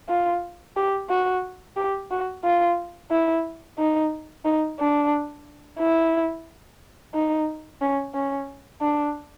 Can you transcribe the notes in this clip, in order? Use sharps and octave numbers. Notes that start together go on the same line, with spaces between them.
F4
G4
F#4
G4
F#4
F4
E4
D#4
D#4
D4
E4
D#4
C#4
C#4
D4